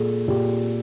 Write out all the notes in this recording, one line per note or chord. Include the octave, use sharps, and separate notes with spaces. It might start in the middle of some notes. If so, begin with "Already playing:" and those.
Already playing: A#2 G#4 A4
A#2 G4